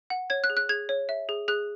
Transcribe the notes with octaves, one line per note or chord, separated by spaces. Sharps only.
F#5
C#5 G#6
F#6
G#4
F#6
G#4 G#6
C#5
E5
G#4
G#4 F#6